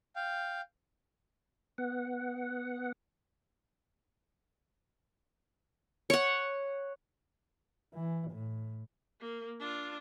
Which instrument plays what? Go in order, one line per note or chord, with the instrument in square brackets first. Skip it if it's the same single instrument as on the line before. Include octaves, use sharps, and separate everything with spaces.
[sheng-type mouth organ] F5 G5
[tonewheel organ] B3 F#5
[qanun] C#5 F#5
[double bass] E3
A2
[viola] A#3
D4 F4